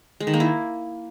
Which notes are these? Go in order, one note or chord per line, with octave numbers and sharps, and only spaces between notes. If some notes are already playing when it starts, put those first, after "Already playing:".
G#3
D#3
A#3
E4